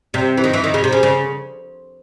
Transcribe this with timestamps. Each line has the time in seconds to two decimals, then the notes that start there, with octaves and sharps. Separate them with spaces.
0.14 C3
0.37 E3
0.44 D#3
0.54 E3
0.64 D#3
0.74 C#3
0.84 C3
0.93 C#3
1.03 C#3